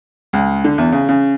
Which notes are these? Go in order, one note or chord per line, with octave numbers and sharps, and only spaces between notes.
C#2
D3
E2
C#3
C#3